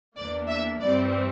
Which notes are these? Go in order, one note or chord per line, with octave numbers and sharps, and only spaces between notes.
E2 E3 A#3 D4 D5
E5
G2 E3 G3 C4 D5